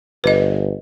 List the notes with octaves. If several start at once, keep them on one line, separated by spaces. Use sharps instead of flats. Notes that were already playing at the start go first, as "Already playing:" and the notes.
G1 B4 D#5